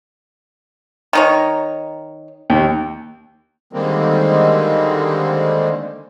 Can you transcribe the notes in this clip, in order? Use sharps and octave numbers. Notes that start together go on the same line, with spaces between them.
D#3 D#4 C#5
D#2
D3 D#3 G3 G#3 A#3 C4